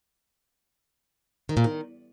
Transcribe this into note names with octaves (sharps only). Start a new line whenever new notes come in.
D#3
A#2
D#3